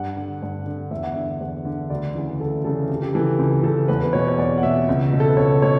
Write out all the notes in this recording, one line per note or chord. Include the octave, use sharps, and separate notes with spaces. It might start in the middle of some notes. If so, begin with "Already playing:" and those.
Already playing: G2 F#5
D3
G2
D3
E2 E5
F#5
D3 E5
E2
D3
D2 D5
C#3 E3
D2 A4
C#3 E3 A4
C#2 G4
G4
C#3 E3 A4
C#2
C#3 E3 A4
E2 B4
B4
B2 C#5
C#5
E2 D5
F#5
B2 E5
C#2
B2
A4
B4
C#2 C#5
B2 C#5